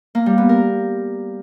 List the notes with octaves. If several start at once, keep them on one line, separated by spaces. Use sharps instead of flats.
A#3
G3
B3
A#4